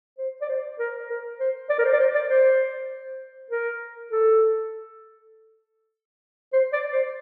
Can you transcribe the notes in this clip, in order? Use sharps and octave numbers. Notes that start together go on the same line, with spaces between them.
C5
D5
C5
A#4
A#4
C5
D5
A#4
C5
D5
C5
D5
C5
A#4
A4
C5
D5
C5